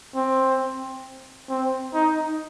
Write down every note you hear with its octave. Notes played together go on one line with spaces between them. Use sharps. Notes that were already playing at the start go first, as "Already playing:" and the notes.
C4
C4
D#4